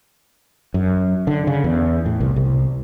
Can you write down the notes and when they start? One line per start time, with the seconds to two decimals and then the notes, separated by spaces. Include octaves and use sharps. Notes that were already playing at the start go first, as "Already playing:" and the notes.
0.74 F#2
1.27 D3
1.47 C#3
1.64 E2
2.06 A2
2.20 C2
2.36 C2